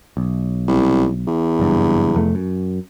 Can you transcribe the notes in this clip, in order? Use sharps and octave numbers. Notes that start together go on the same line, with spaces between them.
B1
C2
E2
F#1 G2
F1 F2 A3
F#2